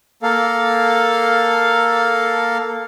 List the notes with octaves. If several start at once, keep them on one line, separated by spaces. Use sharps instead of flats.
A#3 A4 F5